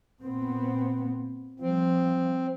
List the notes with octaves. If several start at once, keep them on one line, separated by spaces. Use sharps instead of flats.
A#2 B3 C4
F3 G3 C4